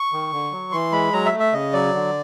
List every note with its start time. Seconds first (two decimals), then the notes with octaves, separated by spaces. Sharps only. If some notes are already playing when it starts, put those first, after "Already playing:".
Already playing: C#6
0.12 D#3
0.32 D3
0.52 F#3
0.72 E3 C6
0.92 G#3 B5
1.13 F#3 A#5
1.26 E5
1.32 A3
1.40 E5
1.53 C#3 D#5
1.73 F#3 D5
1.94 D3